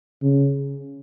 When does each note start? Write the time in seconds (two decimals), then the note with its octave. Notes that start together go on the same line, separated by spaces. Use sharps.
0.22 C#3